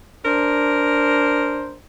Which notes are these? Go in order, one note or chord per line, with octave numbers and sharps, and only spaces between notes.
D4 A#4 C5